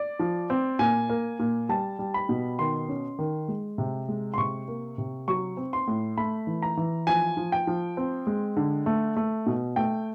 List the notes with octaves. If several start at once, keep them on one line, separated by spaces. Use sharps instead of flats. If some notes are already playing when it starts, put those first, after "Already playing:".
Already playing: D5
F3
C4
A#2 G#5
A#3
A#2
G3 A5
G3
B5
B2
D#3 C6
C#4
D#3
G#3
C3
G#3
C6
C3 C#6
A#3
C3
F#3 C#6
C4
C6
A2
A3 B5
E3
A#5
E3
F3 G#5
F3
G5
F3
C4
G#3
D3
A3
A3
B2
A3 G5